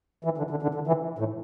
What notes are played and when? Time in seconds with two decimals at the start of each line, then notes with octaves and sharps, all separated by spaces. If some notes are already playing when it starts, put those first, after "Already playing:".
0.25 E3
0.38 D3
0.51 D3
0.62 D3
0.75 D3
0.87 E3
1.19 A2